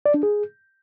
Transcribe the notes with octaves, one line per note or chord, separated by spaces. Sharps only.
D5
D4
G#4